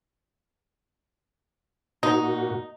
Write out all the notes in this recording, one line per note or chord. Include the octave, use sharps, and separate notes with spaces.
A#2 D#4 F#4